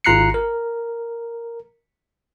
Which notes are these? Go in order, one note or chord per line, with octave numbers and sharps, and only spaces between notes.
G#1 F4 A#5 F#6 C7 C#7
A#4